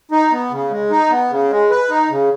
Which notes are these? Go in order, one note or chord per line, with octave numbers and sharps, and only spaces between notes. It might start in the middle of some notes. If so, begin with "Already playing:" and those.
D#4
B3
C#3
G#3
D#4
B3
C#3
G#3
B4
D#4
C#3